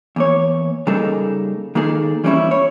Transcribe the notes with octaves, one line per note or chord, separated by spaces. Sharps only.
E2 A#3 C#5
C#3 G3 A#3 D#4 G#4 A4
D#3 A#3 D#4 G#4 A4
E3 G3 A#3 C4 C#4 E4
C#5